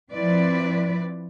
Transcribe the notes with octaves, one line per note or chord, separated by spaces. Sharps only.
F3 C4 E4 B4 D5